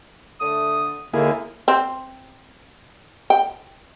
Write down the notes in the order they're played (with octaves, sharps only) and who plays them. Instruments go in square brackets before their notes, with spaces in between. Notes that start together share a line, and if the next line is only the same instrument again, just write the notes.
[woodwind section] D3 A3 D#6
[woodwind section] D#2 D3 [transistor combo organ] A#3 E4 G#4
[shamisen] C4
G5